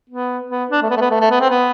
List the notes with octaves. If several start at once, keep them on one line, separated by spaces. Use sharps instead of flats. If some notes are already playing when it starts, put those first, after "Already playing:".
B3
B3
D4
A3
B3
A3
B3
A3
A3
B3
C4
B3